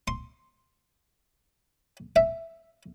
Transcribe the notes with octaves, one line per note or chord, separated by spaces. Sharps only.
C6
E5